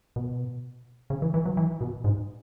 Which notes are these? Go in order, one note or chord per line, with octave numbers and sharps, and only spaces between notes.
B2
C#3
E3
E3
F#3
E3
B2
G#2